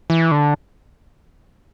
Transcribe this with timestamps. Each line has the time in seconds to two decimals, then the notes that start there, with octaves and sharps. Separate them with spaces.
0.10 E3
0.31 D3